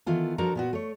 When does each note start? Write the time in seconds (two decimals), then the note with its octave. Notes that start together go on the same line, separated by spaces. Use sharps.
0.06 D#3 E3 B3 F4 A4
0.38 F3 D4 F#4 A4 A#4 A#5
0.55 A#2 B3 F#4
0.73 A3 C#5